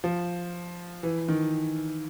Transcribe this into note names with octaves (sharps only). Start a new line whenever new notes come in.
F3
E3
D#3